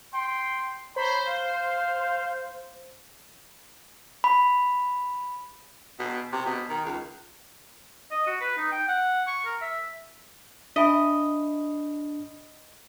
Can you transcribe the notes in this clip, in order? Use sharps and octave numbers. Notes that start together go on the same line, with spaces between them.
G5 C6
C5 C#5 A#5 B5
F5
B5
B2
C3
B2
D#3
C#2
D#5
F#4
B4
D#4
G5
F#5
C#6
A#4
E5
D4 D#5 E5 G#5 B5 D#6 B6